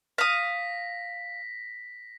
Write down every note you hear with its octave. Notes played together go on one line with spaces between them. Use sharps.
F5 D#6 A#6 B6